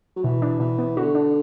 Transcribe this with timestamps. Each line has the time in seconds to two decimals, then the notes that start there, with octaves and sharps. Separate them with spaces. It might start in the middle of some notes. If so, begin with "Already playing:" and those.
0.16 F#3
0.24 B2 E3
0.42 D4
0.60 B2 E3
0.79 B3
0.97 D3 F#4
1.15 D4